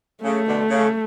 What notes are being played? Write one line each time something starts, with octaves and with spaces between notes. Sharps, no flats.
C#3 A3
B2 D3
C#3